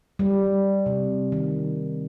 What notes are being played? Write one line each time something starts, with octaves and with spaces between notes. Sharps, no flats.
G3
C3
D#3